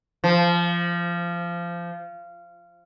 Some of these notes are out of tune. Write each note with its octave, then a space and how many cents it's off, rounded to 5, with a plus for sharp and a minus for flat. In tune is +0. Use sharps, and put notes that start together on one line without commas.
F3 -20